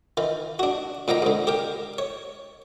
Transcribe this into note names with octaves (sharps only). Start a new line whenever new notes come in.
D#3 E3
D4 F#4
A#2 D#3 A#3 G5 A#5
G#2 D3
G4 A#4 G5
C#5